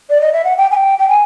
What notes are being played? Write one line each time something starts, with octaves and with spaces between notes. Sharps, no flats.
D5
D#5
E5
F#5
G5
G#5
G5
G5
G#5